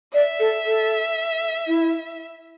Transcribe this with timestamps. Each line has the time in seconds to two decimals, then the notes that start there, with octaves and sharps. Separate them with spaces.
0.14 D5 E5
0.40 A4
0.66 A4
1.68 E4